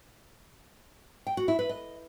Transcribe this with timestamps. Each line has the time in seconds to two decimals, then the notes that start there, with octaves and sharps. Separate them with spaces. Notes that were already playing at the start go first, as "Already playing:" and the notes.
1.27 G5
1.37 F#4
1.48 E4
1.59 B4
1.69 D#5